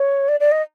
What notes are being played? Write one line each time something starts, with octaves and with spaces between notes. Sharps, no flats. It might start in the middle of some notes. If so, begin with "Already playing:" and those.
Already playing: C#5
D5
D5
D#5